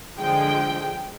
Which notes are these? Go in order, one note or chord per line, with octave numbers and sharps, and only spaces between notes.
D3 F3 G#3 G5